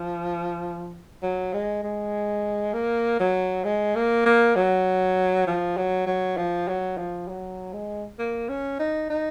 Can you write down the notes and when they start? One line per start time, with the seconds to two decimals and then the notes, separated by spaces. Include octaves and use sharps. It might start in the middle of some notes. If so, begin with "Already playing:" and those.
Already playing: F3
1.23 F#3
1.54 G#3
1.83 G#3
2.74 A#3
3.20 F#3
3.64 G#3
3.95 A#3
4.26 A#3
4.56 F#3
5.47 F3
5.77 F#3
6.06 F#3
6.37 F3
6.68 F#3
6.97 F3
7.28 F#3
7.73 G#3
8.19 A#3
8.49 C#4
8.79 D#4
9.10 D#4